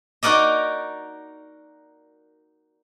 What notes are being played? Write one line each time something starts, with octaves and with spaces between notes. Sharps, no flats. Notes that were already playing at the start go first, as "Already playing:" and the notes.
D#4 F#4 A#4 D5 D#5